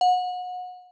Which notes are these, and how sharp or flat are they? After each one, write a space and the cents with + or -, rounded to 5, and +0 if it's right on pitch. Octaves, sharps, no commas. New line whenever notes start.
F#5 -30